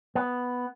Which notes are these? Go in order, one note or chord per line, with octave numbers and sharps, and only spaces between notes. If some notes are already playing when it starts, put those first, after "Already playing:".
B3